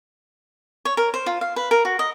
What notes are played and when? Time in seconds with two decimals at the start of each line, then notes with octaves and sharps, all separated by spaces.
0.85 C#5
0.97 A#4
1.14 C5
1.26 F4
1.41 F5
1.56 B4
1.71 A#4
1.85 F#4
1.99 D#5